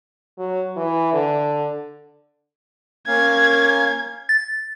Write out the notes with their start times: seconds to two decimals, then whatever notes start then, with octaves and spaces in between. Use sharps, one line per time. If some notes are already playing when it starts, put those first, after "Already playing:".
0.38 F#3
0.77 E3
1.13 D3
3.08 A#3 C#4 F5 G#6
4.29 A6